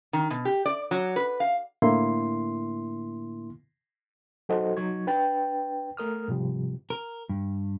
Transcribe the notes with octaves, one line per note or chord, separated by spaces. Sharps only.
D#3
B2
G4
D5
F#3
B4
F5
A2 D3 A#3 E4 C6
F#3 D#4 F#4 A4 C5 D#5
F#3 D#4 C#6 G#6
D4 B4 G5 A6
A3 A#4 D#6 F6
G#2 C3 F3 G3
A#4
G2